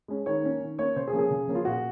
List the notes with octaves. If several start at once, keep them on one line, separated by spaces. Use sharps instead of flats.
G#3 C#4
D#3 C#5
A#3 C#4
D#3
A#3 C#4 C#5
C#3 C5
G#4
F3 A#3 C#4
G#4
C#3
F3 A#3 C#4
F4
A#2 F#4